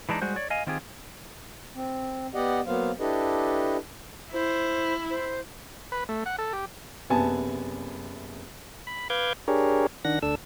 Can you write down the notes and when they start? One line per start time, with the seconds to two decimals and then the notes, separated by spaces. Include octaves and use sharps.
0.09 E3 G#3 D4 D#4
0.22 G3 G#3 F#4 C5
0.36 C#5 D5
0.50 D#5 F5 G#5
0.67 D#3 C4 F4 G4 G#4
1.75 C4
2.35 B3 G4 D5 D#5 F#5
2.67 F#3 A#3 B3 C5 F5
3.00 D4 E4 G4 A4 B4 D#5
4.33 E4 C5
5.10 C5
5.92 B4
6.09 A3
6.26 F#5
6.39 A4
6.53 G4
7.10 F#1 C3 B3 G#5 A5
8.87 B5
9.10 B4 F5 D6 G6 G#6
9.48 D4 G4 G#4 A#4 C#5
10.05 D#3 D4 F#5 A#6
10.22 D2 D4 A4 E6